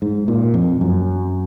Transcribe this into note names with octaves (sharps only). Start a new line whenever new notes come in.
G#2
A#2
F2
F#2